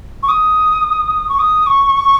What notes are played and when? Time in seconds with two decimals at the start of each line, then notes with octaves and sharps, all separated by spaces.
0.23 C#6
0.28 D#6
1.29 C#6
1.39 D#6
1.66 C#6